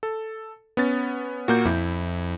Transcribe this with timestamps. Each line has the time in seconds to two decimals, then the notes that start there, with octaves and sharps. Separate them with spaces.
0.03 A4
0.77 B3 C#4 A6
1.48 A#2 A#3 F#4 G6
1.66 F2 E4